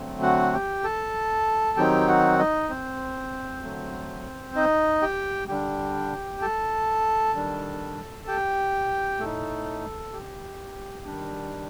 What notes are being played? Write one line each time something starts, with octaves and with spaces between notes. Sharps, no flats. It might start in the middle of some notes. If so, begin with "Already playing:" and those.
Already playing: D3 F#3 A3 C4
F#4 F#5
G4 G5
A4 A5
D#3 F#3 C4 D#4 G4 G5
F#4 F#5
D#4 D#5
C4 C5
D3 F#3 A3
D#4 D#5
G4 G5
D3 G3 D4 G4 G5
A4 A5
D#3 G3 D4
G4 G5
A2 A3 D#4 A4
G4
D#3 G3 D4